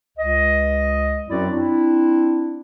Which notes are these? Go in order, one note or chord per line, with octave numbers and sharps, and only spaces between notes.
C#2 D#5
F#2 F#3 C4 E4 F#4 D5
C4 D4 E4